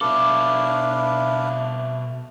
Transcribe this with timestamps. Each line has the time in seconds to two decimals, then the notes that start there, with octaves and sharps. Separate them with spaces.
0.01 B2 D4 A4 B4 E5 F5 D6